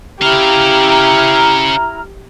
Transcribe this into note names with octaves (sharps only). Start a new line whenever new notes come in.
C#4 E4 G4 F5 A#5 F6